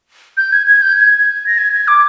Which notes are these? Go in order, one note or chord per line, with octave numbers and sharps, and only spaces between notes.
G6
G#6
G#6
G6
G#6
A#6
G#6
G#6
D6